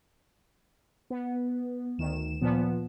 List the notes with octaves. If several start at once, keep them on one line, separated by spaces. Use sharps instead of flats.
B3
D2 D#3 E7
A#2 F3 B3